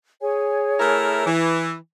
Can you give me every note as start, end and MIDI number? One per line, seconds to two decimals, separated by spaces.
0.21 1.27 68
0.21 1.27 73
0.21 1.27 80
0.80 1.22 57
0.80 1.22 64
0.80 1.22 70
1.26 1.75 52